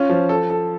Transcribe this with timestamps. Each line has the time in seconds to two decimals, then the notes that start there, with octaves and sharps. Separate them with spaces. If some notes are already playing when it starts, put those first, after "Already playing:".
Already playing: C#4 F4
0.09 F3
0.29 A4
0.50 A4